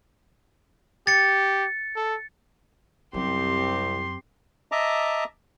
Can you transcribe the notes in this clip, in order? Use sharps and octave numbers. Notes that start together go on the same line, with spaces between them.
G4 A6 C#7
A4
C2 F#2 C4 G4 C6
D#5 E5 A5 A#5 D6